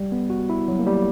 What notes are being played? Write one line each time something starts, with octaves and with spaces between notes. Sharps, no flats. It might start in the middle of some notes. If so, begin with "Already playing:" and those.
Already playing: G3
B3
F#4
E4
F#3
A#3
G3